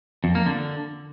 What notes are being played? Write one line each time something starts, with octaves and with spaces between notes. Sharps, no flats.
F2
A#3
D3